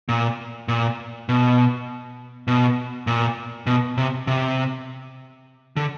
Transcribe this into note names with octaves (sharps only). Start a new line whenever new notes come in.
A#2
A#2
B2
B2
A#2
B2
C3
C3
D3